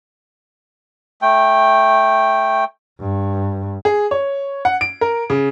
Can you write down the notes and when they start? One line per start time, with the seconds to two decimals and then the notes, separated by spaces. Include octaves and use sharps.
1.22 A3 G5
3.00 G2
3.85 G#4
4.11 C#5
4.65 F#5
4.81 D7
5.01 A#4
5.30 C#3